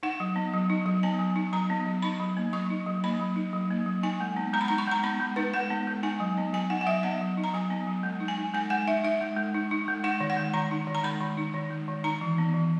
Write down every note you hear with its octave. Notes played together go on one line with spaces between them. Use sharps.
D#4 F#5
F#3
B3
F#3
D#4
F#3
B3 G#5
F#3
D#4
F#3 A#5
B3
F#3
D#4 B5
F#3
A#3
F#3 C#6
D#4
F#3
A#3 B5
F#3
D#4
F#3
A#3
F#3
D#4 G#5
G#3
B3
G#3 A#5
B5
D#4 A#5
C#6
G#3 A#5
B3 B5
G#3
D#4 B4
G#3 F#5
B3
G#3
D#4 G#5
F#3
B3
F#3 G#5
D#4 F#5
F#5
F#3 E5
B3 F#5
F#3
D#4
A#5
F#3 G#5
B3
F#3
G#3
D#4
G#5
D#4
G#3 G#5
G#3 F#5
D#4 E5
D#4 E5
G#3
G#3
D#4
D#4
G#3
D#4 F#5
D#3
F#5
G#3
D#3 A#5
D#4
D#3
A#5
G#3 B5
D#3
D#4
D#3
G#3
D#3
D#4 A#5
E3
B3
E3